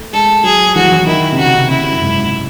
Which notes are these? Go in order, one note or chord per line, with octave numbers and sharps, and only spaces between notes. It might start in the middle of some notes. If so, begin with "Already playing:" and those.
Already playing: A3
G#3 A4
F#3 G#4
E3 F#4
F#3
E3
D#3 E4
C3
C#3 F#4
C#3 E4
C3
F#2
G#2
G#2